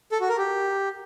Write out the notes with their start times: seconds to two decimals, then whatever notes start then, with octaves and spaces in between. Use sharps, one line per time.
0.12 A4
0.20 F#4
0.29 A#4
0.37 G4